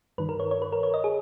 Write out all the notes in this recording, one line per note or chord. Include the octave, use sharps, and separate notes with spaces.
G2 D#3 B4
A#4
C#5
C#5
B4
A#4
C#5
D#5
G#4